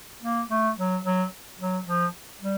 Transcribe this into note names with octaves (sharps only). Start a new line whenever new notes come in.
A#3
A3
F#3
F#3
F#3
F3
G3